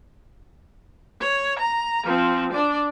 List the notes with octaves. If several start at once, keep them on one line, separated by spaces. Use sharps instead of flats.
C#5
A#5
F3 C4
D4 D5